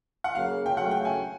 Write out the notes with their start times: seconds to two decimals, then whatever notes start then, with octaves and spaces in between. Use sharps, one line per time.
0.24 F#5
0.35 C#3 F#3 A#3 F5
0.66 G5
0.77 C#3 F#3 A3 F#5
0.91 G5
1.05 G#5